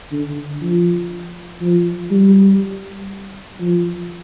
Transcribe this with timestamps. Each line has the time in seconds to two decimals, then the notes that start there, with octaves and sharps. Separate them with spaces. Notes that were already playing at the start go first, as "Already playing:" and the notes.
0.11 D3
0.62 F3
1.61 F3
2.11 G3
3.60 F3